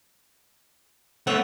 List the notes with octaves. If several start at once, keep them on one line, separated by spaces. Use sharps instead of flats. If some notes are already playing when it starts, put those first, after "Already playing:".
A3 B3 C#5 E5 F#5